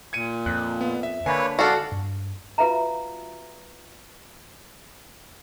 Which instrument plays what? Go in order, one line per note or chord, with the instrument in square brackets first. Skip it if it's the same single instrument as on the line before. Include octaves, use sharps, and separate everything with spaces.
[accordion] A#2 [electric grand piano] G#6 C#7 D#7
[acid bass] F2 [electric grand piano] F#6
[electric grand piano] B3
E5
[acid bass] D3 [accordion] A#3 B4 C#5 [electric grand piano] G#5 B5
[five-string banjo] F#4 A4 [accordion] D5 F5 F#5
[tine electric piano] G2
[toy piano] F4 F#4 B4 E5 F5 A#5